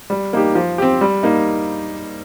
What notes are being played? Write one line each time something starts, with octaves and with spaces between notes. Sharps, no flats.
G3
A#3 D#4 G4
F3
C4 G4
G3
A#3 D#4